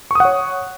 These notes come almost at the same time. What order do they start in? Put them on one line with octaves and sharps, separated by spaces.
C#6 D#6 F#5 C#5